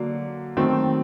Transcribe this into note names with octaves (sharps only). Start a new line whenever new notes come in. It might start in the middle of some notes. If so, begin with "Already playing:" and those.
Already playing: D3 F#3 A#3
D#3 F#3 A3 C4